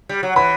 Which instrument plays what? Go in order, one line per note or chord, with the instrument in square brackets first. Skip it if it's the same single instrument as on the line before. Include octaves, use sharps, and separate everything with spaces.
[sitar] G3
F#3
[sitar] E3 [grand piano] B5